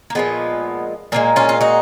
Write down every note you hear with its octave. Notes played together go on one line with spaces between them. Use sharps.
A#3
A#2 F3 G#3 B3
A#2 F3 G#3 A#3
C#4 F4
F4
D#4 F#4